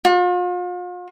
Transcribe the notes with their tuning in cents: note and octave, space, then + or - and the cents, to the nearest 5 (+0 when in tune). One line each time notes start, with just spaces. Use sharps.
F4 +40